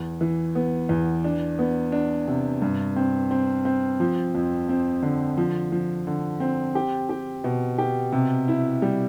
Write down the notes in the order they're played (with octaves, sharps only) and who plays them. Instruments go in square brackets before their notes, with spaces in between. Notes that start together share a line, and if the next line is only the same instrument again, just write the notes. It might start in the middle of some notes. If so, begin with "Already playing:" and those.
Already playing: [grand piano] E2
E3
B3
E2
D4
B3
D4
C3
G2
C4
C4
C4
F3
F2
C4
D3
F3
F3
D3
C4
G4
G4
B2
G4
C3
E4
G3